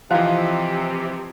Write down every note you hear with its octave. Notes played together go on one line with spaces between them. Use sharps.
C3 E3 F3 F4 C5 D#5 F5